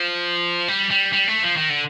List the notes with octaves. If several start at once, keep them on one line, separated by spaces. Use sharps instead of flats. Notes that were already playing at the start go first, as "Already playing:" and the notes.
Already playing: F3
G3
G3
G3
A3
F3
D#3
D3